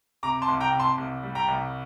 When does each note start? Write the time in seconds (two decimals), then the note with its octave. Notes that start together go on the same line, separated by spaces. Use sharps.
0.23 C3 A#5 D6
0.42 A5 C6
0.48 C2
0.60 G5 A#5
0.73 C3
0.80 A5 C6
0.98 C2
1.23 G3
1.35 G5 A#5
1.48 C2